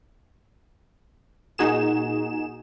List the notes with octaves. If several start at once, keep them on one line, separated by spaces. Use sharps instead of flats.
A#2 D#4 F#4 G#4 E7